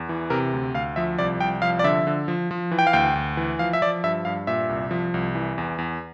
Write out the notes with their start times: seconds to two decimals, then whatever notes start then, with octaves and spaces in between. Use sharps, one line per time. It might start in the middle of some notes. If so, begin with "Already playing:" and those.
Already playing: E2
0.09 E3
0.30 C3 A#4
0.53 D2
0.74 D2 F5
0.96 F3 E5
1.18 C2 D5
1.40 C2 G5
1.62 F3 F5
1.79 D5
1.84 D3 E5
2.07 D3
2.28 F3
2.51 F3
2.71 E3
2.79 G5
2.87 F5
2.93 D2 G5
3.15 D2
3.37 E3
3.59 F3 F5
3.73 E5
3.82 F3 D5
4.04 G2 E5
4.25 G2 F5
4.47 A#2 E5
4.69 C2
4.91 F3
5.14 C2
5.35 E3
5.58 E2
5.78 E2